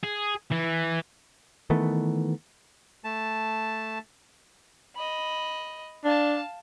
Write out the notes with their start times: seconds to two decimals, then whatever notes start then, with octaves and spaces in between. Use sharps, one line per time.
0.04 G#4
0.51 E3
1.70 D#3 E3 A3 B3
3.04 A3 A5
4.96 D#5 B5
6.05 D4 F5 A5